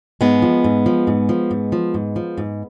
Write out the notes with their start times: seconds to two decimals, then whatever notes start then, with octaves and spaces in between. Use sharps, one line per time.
0.21 G#2 G#3 B3
0.42 F3
0.64 G#2
0.86 F3
1.07 G#2
1.29 F3
1.51 G#2
1.72 F3
1.94 G#2
2.16 F3
2.38 G#2